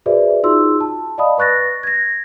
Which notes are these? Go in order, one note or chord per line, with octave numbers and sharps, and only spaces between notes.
F#4 G#4 B4 C5 D5 E5
D#4 F4 F#4 G#4 C6 E6
A5
D5 D#5 F5 A5 B5 D#6
B4 C#6 F#6 A6 A#6
G#6 A#6